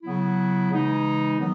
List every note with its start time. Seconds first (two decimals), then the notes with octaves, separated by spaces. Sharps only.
0.03 C#3 F#3 B3 E4
0.70 C#3 E3 G#3 D#4
1.38 D#3 F#3 B3